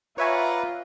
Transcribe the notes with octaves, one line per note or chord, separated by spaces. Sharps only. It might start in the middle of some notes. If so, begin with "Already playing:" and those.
F4 B4 C#5 D5 E5 F#5 G#5 A#5